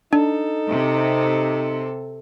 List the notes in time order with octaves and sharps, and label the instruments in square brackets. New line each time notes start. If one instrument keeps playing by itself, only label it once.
[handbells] D4 [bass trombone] D#4 [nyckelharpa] A4
[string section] C3